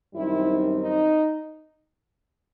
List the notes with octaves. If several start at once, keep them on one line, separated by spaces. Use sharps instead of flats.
F#2 D#3 G3 C4 D#4 E4
D#4